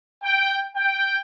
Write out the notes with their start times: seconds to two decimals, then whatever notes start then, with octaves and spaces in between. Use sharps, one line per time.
0.23 G5
0.76 G5